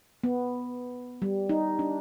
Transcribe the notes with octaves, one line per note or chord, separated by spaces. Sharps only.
B3
G3
D#4
D4